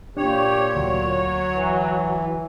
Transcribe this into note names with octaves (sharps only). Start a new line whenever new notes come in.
A#2 D4 G4 C#5
D2 F#3
E3